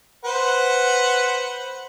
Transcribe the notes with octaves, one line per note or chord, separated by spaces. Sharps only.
B4 C5 F#5